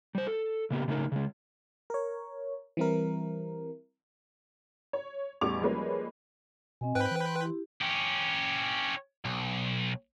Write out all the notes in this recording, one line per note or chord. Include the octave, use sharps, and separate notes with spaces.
G3 C5
A4
C#3 A#3 B3 G4
C#3 A3 D#4 A4 A#4
C#3 G#3
A#4 C#5
E3 G3 C4 E4 A#4
C#5
A1 E2 G3 C#6 D6 F7
F3 G3 G#3 A#3 B4 C#5
B2 C4 D#5 G#5
G#2 B4 C5 G5 F#6
E3
B5 C6
E4 G4
C#4 G4
B1